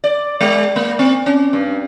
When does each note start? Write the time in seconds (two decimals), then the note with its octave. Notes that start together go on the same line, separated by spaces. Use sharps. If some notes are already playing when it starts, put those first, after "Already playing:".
0.04 D5
0.41 G#3
0.76 A#3
0.99 C4
1.26 C#4
1.53 G2